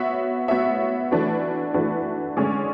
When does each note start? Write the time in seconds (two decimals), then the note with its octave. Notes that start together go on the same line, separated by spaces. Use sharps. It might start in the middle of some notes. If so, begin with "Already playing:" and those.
Already playing: B3 F#4 C#5 E5
0.48 B3 F#4 C#5 E5
1.11 E3 A3 D4 F#4 B4
1.74 E3 A3 D4 F#4 B4
2.36 D3 G#3 C#4 G#4 D5